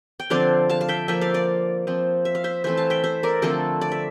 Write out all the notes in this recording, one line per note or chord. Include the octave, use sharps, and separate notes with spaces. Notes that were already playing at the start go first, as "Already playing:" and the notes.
G5
D3 F3 C4 D5 F5
F5 A5
F5
E5 G5
F3 A#3 E5 G5
D5 F5
D5 F5
F3 C4
E5
F5
C5 E5
E3 A3 C4 C5 E5
F5 A5
E5 G5
C5 E5
A#4 D5
D3 F3 A3 C4 A4 C5
D5
E5